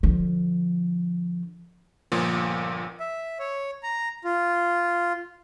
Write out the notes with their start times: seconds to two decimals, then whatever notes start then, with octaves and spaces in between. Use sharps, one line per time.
0.03 D3 F3
2.12 G1 A#2 F3
3.00 E5
3.39 C#5
3.83 A#5
4.24 F4